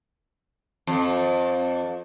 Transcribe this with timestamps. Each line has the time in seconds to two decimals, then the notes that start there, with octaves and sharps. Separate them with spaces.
0.87 F2